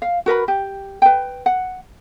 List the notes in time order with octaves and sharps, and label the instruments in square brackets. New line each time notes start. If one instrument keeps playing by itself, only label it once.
[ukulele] F5
F#4 A#4 B4 B5
G4
B4 G5
F#5